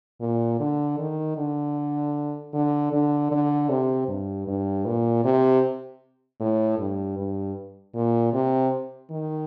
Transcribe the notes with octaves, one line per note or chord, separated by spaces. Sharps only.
A#2
D3
D#3
D3
D3
D3
D3
C3
G2
G2
A#2
C3
A2
G2
G2
A#2
C3
D#3